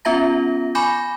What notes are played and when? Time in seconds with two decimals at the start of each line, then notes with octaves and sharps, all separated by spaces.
0.05 B3 C#4 F4 E5 A#5 A#6
0.75 G#5 B5 C#6 D6 G6 A#6